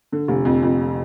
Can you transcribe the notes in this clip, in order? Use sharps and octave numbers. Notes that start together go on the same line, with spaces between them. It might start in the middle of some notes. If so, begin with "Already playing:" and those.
D3
F1
F2
F2